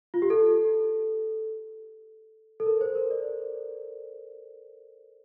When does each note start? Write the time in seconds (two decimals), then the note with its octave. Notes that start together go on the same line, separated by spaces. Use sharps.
0.14 F4
0.22 G4
0.30 A4
2.60 A4
2.66 A#4
2.81 C5
2.95 A#4
3.11 D5